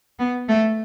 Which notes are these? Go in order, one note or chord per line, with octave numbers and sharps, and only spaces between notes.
B3
A3